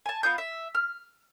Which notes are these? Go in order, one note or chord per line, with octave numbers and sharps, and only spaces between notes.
G#5 A5
B3 F4 D#5 G6
E5
F6